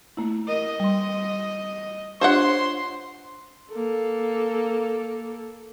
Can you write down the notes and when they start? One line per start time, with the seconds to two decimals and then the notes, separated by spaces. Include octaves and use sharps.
0.17 A3 A#3 E4
0.48 A#4 D#5
0.80 G3 C6
2.21 D4 F4 G4 C5 C#5 F#5 C6
3.72 A#3 A4